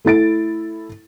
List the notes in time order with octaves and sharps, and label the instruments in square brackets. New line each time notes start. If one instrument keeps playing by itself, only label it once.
[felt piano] A3 E4 A6 D7